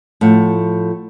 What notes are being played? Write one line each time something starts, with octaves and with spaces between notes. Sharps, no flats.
A2 F3 F#5